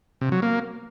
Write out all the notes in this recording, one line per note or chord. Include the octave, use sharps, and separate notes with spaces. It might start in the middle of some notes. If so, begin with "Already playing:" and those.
C3
F#3
A#3